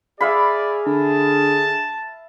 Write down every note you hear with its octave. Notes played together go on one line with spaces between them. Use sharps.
G#4 D5 E5 F5 B5
D3 A5